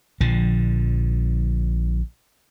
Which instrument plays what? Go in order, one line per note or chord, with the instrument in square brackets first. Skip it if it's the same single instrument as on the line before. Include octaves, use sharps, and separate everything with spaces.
[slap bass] A#1 D3 F3